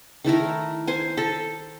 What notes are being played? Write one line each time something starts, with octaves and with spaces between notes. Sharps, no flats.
D#3 A3 E4 A#4
C5 G#5
A4